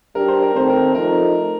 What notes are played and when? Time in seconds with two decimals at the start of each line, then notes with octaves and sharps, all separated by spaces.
0.15 G3 D4 G4 A#4
0.28 C5
0.42 A#4
0.54 D#3 A3 C4 C5
0.69 A#4
0.94 F3 A3 D#4 A#4